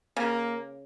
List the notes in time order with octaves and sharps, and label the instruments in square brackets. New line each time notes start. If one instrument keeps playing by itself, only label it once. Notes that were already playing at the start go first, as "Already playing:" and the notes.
[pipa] C#3 [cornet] A#3